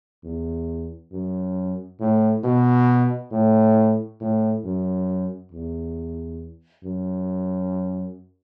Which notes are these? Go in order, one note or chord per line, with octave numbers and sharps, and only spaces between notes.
E2
F#2
A2
B2
A2
A2
F#2
E2
F#2